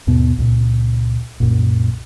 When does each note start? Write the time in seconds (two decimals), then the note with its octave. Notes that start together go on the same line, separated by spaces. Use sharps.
0.07 D#2 G#2 B2 B3
0.38 C#2 A#2
1.40 C2 F#2 A#2